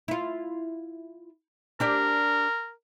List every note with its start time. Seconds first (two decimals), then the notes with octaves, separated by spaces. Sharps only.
0.08 E4 F4
1.80 D4 G4 A#4 D5